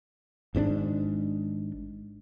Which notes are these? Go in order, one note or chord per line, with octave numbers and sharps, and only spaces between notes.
G#1 G#2 C#4 D4